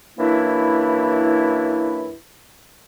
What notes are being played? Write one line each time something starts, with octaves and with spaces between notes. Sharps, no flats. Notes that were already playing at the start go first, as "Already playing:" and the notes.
F#2 E3 A#3 D4 E4